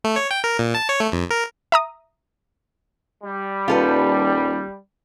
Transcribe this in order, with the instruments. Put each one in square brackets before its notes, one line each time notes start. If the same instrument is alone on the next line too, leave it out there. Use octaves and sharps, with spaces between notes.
[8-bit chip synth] A3
C#5
G5
A#4
A#2
A5
C#5
A3
F2
A#4
[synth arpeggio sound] E5 A#5 D#6
[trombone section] G3
[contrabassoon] D#1 [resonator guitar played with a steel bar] F4 A4 B4